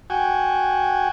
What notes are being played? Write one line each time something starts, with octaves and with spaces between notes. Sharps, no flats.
F#4 G5 G#5